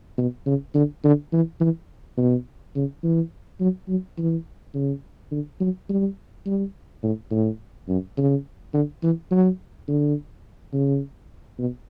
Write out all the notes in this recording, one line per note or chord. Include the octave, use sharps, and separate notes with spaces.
B2
C#3
D3
D3
E3
E3
B2
C#3
E3
F#3
F#3
E3
C#3
D3
F#3
G3
G3
A2
A2
F#2
C#3
D3
E3
F#3
D3
C#3
B2